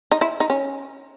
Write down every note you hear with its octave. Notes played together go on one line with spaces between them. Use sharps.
D#4
E4
D#4
C#4